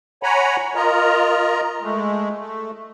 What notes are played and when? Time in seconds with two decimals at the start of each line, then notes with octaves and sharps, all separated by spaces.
0.23 C#5 F#5 G#5 A#5 B5
0.75 F4 A#4 D#5 A#5
1.82 G#3 A3
2.38 A3